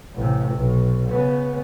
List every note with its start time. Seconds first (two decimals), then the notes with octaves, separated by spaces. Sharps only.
0.14 A1 C3
0.54 B1
1.10 C#3 B3